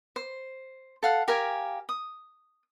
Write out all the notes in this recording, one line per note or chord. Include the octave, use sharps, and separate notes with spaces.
C5
A4 F5 F#5
G4 A#4 F5 G#5
D#6